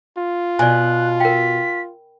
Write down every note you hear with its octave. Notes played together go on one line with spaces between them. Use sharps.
F4
B2 D5 G#5 F#6
A#4 G5 B6